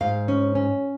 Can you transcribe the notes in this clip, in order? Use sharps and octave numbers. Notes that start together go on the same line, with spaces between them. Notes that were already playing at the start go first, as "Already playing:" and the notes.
G#2 F5
C#4
C#4